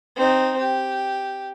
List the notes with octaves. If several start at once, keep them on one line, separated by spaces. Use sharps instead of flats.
C4 D#4
G4